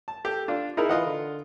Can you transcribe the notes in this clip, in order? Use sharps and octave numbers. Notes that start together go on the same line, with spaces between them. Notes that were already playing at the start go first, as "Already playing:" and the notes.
A5
G4 A4
D4 F4
D#4 E4 G#4 A#4
E3 F4 D#5 F#5
D3